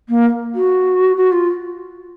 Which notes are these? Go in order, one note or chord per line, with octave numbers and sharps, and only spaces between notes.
A#3
F#4
F#4
F4